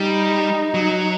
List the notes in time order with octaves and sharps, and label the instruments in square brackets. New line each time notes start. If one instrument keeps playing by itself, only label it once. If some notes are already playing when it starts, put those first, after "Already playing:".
Already playing: [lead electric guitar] G3 [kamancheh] D#4
[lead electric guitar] F#3